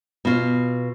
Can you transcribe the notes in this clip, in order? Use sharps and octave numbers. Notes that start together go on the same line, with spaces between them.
B2 F4